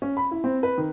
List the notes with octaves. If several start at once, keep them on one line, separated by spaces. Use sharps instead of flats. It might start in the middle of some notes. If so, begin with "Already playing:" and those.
C#4
B5
E4
C4
B4
D#3